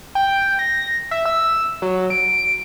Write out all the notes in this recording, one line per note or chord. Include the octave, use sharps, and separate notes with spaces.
G5
A#6
E5
E6
F#3
D7